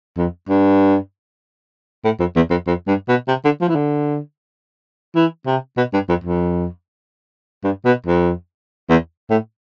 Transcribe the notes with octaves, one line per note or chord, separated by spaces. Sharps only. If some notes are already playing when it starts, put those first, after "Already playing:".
F2
G2
A2
F2
E2
F2
F2
G2
B2
C3
D3
F3
E3
D3
E3
C3
B2
G2
F2
F2
G2
B2
F2
E2
A2